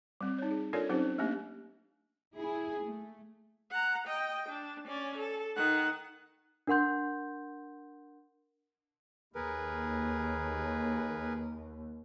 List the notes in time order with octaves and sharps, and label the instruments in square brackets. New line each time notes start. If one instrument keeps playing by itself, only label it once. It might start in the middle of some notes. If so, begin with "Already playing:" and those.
[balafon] G3 C4
D#4 C#5
G#4
D4 F4 A4 A#4 C#5 D5
F#3 C4 C#4 D#4 G4 C5
A3 A#3 C#4 D4 G4
[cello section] E4 G#4
A3
[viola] F#5 A#5
D#5 G5
D4
C#4 D5
A4
D#3 F#5
[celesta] D4 A#4 F#5 C6 G6
[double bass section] D#2 [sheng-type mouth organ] G#4 A#4 B4